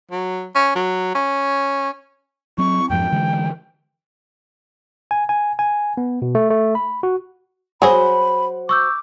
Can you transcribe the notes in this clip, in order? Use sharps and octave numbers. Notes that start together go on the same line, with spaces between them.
F#3
C#4
F#3
C#4
F#3 C4 C#6
F2 G#2 F3 G5
D3 E3 G#3
G#5
G#5
G#5
B3
B2
A3
A3
B5
F#4
F#3 F#4 G#4 C5 B5
C#6 D6 E6 G6